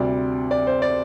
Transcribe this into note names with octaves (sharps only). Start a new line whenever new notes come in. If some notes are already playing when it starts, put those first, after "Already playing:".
Already playing: D2 C3 G3 D5
D5
C5
D5